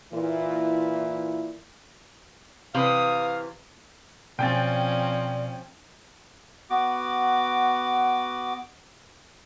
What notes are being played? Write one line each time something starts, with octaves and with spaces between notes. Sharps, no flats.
A#2 E3 E4
C3 E3 B4 F5 D#6
B2 F3 C4 C#4 D5 G5 G#5 A6
B3 F#4 D6